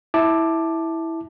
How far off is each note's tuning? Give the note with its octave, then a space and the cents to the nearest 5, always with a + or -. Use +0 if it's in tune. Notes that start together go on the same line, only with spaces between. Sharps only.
E4 -10 A5 +0 D6 +10